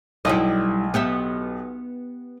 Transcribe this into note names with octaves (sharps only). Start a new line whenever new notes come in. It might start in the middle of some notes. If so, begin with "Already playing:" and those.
B1 G3 E4 D#5
B3 G4 E5